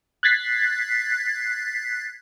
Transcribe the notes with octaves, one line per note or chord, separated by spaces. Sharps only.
F#6 G#6 A6 B6 C7